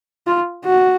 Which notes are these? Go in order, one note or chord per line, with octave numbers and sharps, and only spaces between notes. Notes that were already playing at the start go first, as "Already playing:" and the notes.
F4
F#4